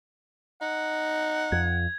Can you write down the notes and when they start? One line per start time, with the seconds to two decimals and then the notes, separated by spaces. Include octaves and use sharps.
0.62 D#4 F#5
1.52 F2 G#6